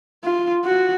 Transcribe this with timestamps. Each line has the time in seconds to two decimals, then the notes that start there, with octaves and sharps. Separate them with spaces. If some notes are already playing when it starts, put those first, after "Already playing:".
0.24 F4
0.64 F#4